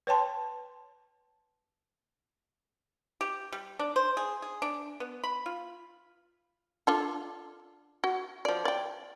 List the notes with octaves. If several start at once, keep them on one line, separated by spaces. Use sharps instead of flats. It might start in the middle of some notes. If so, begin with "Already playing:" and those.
B4 C#5 G5 A5 C6
G4
G3
D4
C5
G#4
G#4
D4
B3
B5
F4
D4 F4 A4
F#4
F3 D5
D5 G5